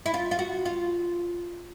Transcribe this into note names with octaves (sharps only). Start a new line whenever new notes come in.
E4
F4
F4
F#4
F4